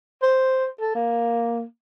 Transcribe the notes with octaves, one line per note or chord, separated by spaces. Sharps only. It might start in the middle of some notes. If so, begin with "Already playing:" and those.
C5
A4
A#3